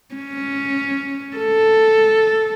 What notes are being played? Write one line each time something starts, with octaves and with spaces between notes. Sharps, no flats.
C#4
A4